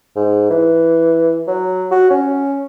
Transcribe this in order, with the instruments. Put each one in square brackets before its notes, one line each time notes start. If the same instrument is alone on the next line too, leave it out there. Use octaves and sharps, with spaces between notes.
[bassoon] G#2
E3
F#3
F#4
C#4